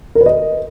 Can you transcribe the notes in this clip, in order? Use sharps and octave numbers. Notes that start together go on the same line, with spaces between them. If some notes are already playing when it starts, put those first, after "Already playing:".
A#4
B4
D#5